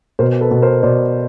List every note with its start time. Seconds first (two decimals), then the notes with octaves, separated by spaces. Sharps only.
0.19 B2 A#4 C5
0.41 A4 B4
0.51 B2
0.62 A#4 C5
0.83 B2 C5 D5